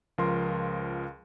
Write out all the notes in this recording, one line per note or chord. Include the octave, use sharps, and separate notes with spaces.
C#2 F3 A#4 C6